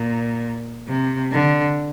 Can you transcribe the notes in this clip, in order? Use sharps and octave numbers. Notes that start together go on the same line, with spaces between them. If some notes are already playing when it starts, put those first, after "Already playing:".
Already playing: A#2
C3
D3